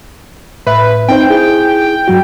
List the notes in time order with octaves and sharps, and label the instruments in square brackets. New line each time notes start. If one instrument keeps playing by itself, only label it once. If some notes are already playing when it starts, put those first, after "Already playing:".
[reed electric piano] A2 E5 [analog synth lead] B4
[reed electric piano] C4 D#4 C5 [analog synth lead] G5
[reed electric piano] E4 G#4
G2 F#3 F#4